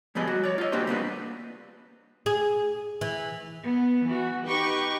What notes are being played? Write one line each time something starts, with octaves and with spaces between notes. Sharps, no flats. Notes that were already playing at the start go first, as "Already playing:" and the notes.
A2 F3 G3 B3 G#4 D#5
G3 F#4
C#5 D5
F4 D#5
G3 A#3 D4 F#4 G4 C5
G3 A#3 B3 D4
G#4
E3
B3
E3 F#4
D#4 G4 B4 G5 C#6